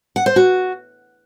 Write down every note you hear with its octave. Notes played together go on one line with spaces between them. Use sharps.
F#5
C5
F#4